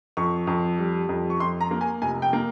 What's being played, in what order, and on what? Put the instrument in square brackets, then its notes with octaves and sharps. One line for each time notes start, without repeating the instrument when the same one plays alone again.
[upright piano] F2 C#6
F2
G3
F2
C#6
F2 C6
A#5
A#3
G#5
F1 G#5
G5
A#3